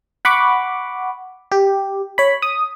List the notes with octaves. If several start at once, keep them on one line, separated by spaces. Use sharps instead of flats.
F#5 B5 C#6 D6
G4
C#5 B5
D#6